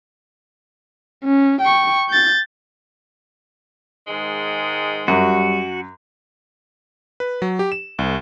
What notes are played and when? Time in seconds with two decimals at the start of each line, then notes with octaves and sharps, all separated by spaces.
1.25 C#4
1.62 G5 C#6
2.10 G6 A6
4.07 G#2 D#3 G#3
5.08 F#2 G3 F#4
7.20 B4
7.42 F#3
7.59 G4
7.72 E7
7.99 C2